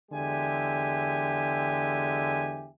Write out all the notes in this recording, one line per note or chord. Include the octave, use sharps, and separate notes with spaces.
E2 D3 G#3 G4 E5 G#5